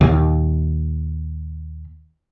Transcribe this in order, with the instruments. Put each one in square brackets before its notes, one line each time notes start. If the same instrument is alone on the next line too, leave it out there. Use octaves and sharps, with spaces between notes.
[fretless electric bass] D#2 A#2